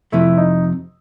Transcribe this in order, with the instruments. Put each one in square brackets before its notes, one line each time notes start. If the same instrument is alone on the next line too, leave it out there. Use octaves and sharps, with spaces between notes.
[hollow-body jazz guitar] F2 C3 F3 A3 [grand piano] E4
[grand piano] D#4